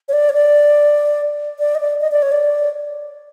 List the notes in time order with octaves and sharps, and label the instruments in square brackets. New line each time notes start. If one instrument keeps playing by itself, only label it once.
[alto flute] C#5
D5
C#5
D5
D5
D#5
D5
D#5
D5
C#5
D5